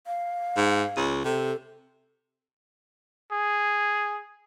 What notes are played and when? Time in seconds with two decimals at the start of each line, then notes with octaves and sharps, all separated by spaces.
0.07 F5
0.57 G#2
0.97 C#2
1.25 C3 A4
3.32 G#4